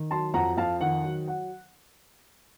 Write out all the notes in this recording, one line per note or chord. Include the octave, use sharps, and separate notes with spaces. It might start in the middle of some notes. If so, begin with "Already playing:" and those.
Already playing: D#3
F#3 A5 C6
F2 F#5 A#5
F2 F5 A5
D#3 F#5
F#3
F#5